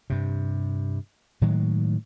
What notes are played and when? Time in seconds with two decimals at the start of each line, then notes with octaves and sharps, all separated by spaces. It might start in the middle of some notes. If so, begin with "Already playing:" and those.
0.10 G2 C3
1.41 A2 D#3 F#3 G#3